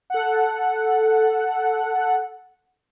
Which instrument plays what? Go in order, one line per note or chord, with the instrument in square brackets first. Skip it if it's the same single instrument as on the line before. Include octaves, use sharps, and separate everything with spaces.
[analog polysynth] A4 F#5